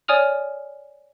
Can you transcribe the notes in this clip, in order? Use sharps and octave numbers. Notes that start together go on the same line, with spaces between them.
C#5 D5 G#5 D#6 F6 F7